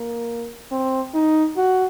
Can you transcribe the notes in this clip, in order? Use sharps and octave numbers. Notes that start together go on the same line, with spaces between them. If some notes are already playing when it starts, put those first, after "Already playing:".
Already playing: A#3
C4
D#4
F#4